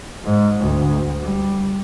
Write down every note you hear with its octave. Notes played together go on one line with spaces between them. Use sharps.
G#2
D2
G3